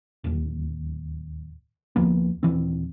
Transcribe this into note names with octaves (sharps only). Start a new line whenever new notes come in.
D1 D#2
D2 F3 A#3 B3
D#1 E3 C4